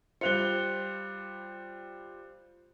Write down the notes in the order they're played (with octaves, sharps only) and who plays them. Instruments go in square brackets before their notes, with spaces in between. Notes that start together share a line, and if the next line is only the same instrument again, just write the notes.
[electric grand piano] G3 F4 [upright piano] C5 F7 G7 [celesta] F#6 C#7